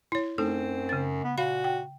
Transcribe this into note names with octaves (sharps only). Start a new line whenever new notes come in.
E4 C#5
F#2 A3 C4 D#4 A4
C#3 A6
B3
A#2 F#4 F5 B5
G5